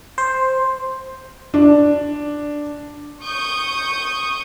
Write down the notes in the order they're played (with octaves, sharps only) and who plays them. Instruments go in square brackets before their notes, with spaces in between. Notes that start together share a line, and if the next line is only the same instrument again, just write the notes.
[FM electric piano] C5
[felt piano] D4
[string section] C#6 D#6 G6